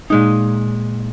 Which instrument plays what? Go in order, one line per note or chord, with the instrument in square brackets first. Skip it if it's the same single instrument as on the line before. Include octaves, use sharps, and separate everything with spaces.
[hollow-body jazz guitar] A#2 G#3 D#4